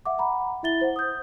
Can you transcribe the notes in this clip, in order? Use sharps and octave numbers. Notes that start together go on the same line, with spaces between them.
E5 F#5 D6
F#5 A#5 B5
E4 E5 A6 G7
C5 F#5
D#6 G6